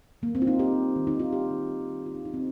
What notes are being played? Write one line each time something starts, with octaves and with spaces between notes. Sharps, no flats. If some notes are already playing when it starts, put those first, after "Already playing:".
D#3 A#3
C4
A#3 F4
D#4
G3 G4
G3
D#3
D#4
D#3
F4
D#3 G4
D#3
D#3
D#3
D#3 F4
D#4
D#3 D#4
C4